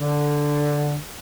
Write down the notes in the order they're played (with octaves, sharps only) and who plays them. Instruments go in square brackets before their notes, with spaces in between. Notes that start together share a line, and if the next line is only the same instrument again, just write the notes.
[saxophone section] D3